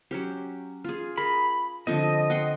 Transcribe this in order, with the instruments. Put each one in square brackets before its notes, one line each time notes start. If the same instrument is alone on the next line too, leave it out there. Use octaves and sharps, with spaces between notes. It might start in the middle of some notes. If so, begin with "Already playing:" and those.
[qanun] F#3 C#4 G4
F4 G#4
[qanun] G#4 A#4 [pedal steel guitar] B5
[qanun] D3 F3 C4 [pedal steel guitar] D#5
[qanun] F#5 G5 C6